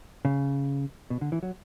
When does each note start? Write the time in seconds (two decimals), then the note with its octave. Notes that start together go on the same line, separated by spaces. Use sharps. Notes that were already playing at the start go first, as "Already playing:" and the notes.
0.25 C#3
1.10 B2
1.21 D3
1.32 E3
1.43 F#3